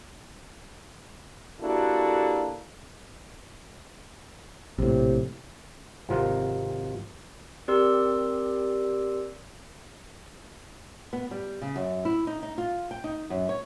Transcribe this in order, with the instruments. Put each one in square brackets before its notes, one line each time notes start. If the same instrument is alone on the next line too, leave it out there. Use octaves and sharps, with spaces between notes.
[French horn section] A#3 D4 E4 F#4 G4 A4
[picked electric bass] A#1 A2 [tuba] C3
[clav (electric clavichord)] G#1 C3 F3 F4 A#4 F#5
[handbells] C4 G4 A#4 D5 C6 E6
[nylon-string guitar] B3
G3
C#3
F#2
E4
D#4
D#4
F4
G5
D#4
F#2
C#5